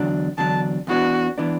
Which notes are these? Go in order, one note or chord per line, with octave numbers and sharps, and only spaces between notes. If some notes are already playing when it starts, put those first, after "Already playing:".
Already playing: E2 D3 F#3 D4
E2 D3 F#3 D4 A5
E2 E3 B3 D4 F#4
E3 B3 D4